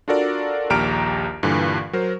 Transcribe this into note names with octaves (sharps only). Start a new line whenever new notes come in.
D4 F4 F#4 A4 A#4 D5
A#1 D#2 G4 A#5 F6 D7
G2 A#2 D3 E3
F#3 A#4 C5